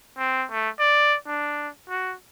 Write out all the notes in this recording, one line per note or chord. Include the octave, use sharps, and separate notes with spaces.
C4
A3
D5
D4
F#4